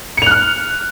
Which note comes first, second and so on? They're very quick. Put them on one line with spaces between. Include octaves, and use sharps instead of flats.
C#7 F7 F#6 F6